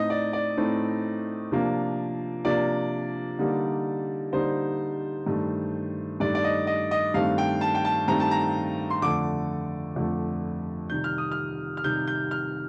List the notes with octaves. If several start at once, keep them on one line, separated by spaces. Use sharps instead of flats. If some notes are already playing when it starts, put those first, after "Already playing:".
Already playing: A2 A3 C4 D#4 D#5
D5
D5
A2 A3 C4 D#4
C3 F3 A#3 D4
C3 F3 A#3 D4 D5
D3 G3 A#3 D#4
D3 G3 A#3 D#4 C5
G2 D#3 A3
G2 D#3 A3 D5
D5
D#5
D#5
D#5
G2 D#3 A3 C4 F5
G5
A5
G5
A5
G2 D#3 A3 C4 A#5
A5
A#5
C6
F2 D3 A3 D6
F2 D3 A3
C3 D#3 G3 G6
F6
D#6
F6
F6
C3 D#3 G3 G6
G6
F6